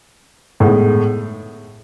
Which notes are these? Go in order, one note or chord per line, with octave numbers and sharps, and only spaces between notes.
A2 G#3 B3